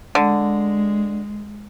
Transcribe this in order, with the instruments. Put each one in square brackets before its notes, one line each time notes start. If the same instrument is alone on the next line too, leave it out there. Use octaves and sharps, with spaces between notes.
[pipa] D3 [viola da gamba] G#3